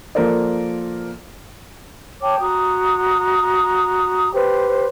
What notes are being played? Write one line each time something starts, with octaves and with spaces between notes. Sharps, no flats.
F3 A#3 A4 A#4 C5 D5
C#5 G5 A5 D6
F#4 A#5 D#6
G4 B4 C5